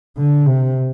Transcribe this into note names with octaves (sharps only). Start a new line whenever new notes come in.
D3
C3